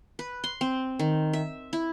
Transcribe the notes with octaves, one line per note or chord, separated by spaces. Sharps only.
B4
C6
C4
D#3
E5
E4